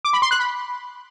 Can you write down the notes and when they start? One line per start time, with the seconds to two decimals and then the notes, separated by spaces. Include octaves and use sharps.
0.05 D6
0.13 B5
0.22 C6
0.31 F#6
0.40 B5